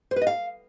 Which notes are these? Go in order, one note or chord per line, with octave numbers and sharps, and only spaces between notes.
C5
B4
D#5
F5